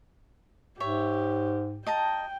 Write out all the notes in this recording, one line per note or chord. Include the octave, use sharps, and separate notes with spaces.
G#2 G4 C#5 E5
D#5 G5 A5 A#5